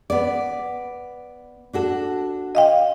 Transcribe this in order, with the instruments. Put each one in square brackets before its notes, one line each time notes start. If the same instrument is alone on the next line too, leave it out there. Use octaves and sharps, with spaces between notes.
[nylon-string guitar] B3 D5
D4 F#4 A4
[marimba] D#5 F5 G5